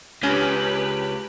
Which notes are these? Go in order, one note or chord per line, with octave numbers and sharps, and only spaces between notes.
C#2 C#4 G4 B4